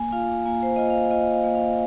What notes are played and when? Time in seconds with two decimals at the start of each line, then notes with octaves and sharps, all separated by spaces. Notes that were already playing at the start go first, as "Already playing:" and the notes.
Already playing: A#3 G#5
0.12 F4 F5
0.46 A#3 G#5
0.63 C5
0.76 F4 D#5
0.90 F5
1.11 F4 D#5
1.33 F5
1.44 A#3
1.55 F5